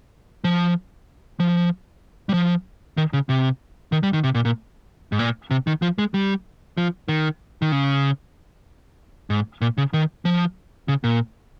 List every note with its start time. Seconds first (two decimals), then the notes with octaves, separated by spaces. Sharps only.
0.44 F3
1.40 F3
2.29 G3
2.34 F3
2.97 D#3
3.13 C#3
3.29 C3
3.92 D#3
4.03 G3
4.13 D#3
4.24 C3
4.35 A#2
4.45 A#2
5.12 G#2
5.19 A#2
5.51 C3
5.67 D#3
5.82 F3
5.98 G#3
6.14 G3
6.78 F3
7.08 D#3
7.62 D#3
7.72 C#3
9.30 G#2
9.61 A#2
9.78 C#3
9.93 D#3
10.25 F3
10.88 C#3
11.04 A#2